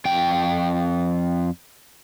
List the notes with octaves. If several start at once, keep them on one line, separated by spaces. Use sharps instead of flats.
F2 G5